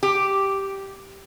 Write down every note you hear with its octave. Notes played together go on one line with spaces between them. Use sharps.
G4